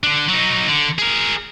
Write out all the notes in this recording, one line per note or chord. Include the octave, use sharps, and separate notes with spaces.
D3 D4
F#3 D#4
D3
G#4 A#4